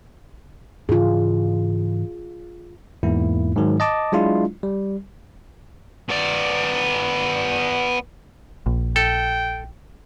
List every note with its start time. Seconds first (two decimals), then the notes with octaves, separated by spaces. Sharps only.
0.89 G#2 C#3 E3 F4 G#4
3.03 E2 G#2 A#3 E4
3.56 G#2 D#3 F#3
3.80 D#5 A5 D6
4.12 F#3 G#3 D4 E4 F4
4.63 G3
6.09 B3 D5
8.66 A#1
8.96 A4 G5